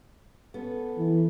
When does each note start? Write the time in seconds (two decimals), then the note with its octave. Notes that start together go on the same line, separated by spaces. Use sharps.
0.54 B3 C#4 A4
0.97 E3